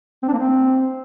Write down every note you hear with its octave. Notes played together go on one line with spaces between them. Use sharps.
C4
D4
A#3
C4